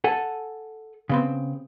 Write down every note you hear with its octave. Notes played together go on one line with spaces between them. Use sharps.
A4 F#5 G#5
C#3 B3 C4